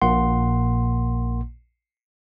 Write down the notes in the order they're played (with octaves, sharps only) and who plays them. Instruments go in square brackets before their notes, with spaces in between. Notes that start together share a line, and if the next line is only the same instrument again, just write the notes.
[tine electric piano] A#1 A#2 A#3 F#5 C6